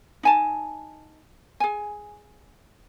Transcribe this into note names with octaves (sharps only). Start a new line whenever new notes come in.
D#4 G#5 A5
G#4 G#5